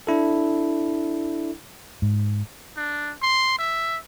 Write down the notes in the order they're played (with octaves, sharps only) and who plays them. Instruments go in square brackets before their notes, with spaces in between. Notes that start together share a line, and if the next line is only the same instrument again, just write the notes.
[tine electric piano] D4 E4 A4
[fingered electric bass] G#2
[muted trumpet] D4
C6
E5